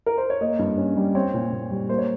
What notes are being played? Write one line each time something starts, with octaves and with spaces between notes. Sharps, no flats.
A#4
C5
C#5
A#3 D#5
G2
C#4
G3
C4 C#5
A#2
A#2
G3
A#3 C5
C#5